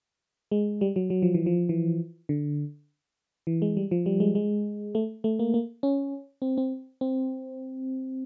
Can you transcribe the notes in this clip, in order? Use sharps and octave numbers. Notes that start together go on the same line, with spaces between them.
G#3
G3
F#3
F#3
F3
E3
F3
E3
D3
E3
G#3
G3
F3
G3
G#3
G#3
A3
A3
A#3
A#3
C#4
C4
C4
C4